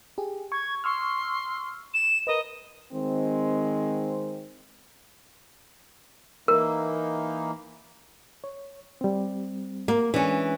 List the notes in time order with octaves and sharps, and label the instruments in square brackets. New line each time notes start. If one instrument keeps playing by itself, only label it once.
[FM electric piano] G4 G#4
[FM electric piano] C#6 [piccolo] G#6
[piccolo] C6 [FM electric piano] C#6 E6 F6
[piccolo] E7
[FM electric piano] A#4 B4 [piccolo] D#5
[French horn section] D#3 G#3 C4
[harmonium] E3 A#3 D#4 [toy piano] A#4
[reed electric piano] C#5
G3 C4
[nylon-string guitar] A#3
[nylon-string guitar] E3 C#4 [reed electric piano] G#3 D4